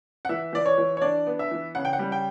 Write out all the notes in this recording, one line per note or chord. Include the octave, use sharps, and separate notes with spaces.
F#5
E3 E5
E3 D5
C#5
E3
C#5
D4 D5
B3
E5
E3
C#3 F#5
G5
F#5
G3
G5